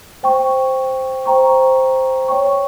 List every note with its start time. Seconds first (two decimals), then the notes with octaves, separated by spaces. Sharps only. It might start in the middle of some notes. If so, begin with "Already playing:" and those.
0.23 C5 G5 C#6
1.26 C5 G5 A#5 C#6
2.28 C#5 G5 C#6